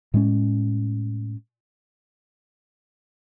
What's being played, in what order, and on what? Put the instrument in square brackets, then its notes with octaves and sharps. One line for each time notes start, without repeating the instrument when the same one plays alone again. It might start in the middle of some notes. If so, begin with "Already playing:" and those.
[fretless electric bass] A2 G#3 C#4